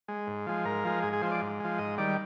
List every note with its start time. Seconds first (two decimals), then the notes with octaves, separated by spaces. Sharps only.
0.08 G#3
0.27 G#2
0.47 F3 G#3
0.65 G#2 A#4
0.85 F3 G#3
1.03 G#2 G#4
1.13 G#4
1.22 F3 G#3 C5
1.31 D5
1.41 G#2
1.60 F3 G#3
1.78 G#2 D#5
1.98 D#3 G3 D5